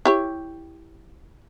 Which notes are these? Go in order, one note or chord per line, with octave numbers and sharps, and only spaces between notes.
E4 G4 C#5